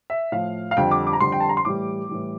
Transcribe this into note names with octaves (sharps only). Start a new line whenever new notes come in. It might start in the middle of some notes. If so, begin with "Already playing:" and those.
E5
A2 F3 F5
F5
F2 D3 G3 G5
D6
D6
A#5
F2 D3 G3 C6
G5
A5
A#5
C6
A2 E3 G3 D6
A2 E3 G3